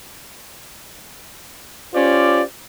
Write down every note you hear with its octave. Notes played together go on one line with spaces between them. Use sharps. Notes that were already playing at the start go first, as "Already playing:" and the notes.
C#4 F4 G4 C5 D5